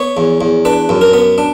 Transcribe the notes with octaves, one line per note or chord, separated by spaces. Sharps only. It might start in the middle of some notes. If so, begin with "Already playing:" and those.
Already playing: B3 C#5
E2
E2
D4 B4
F#2
A#4
B3
D4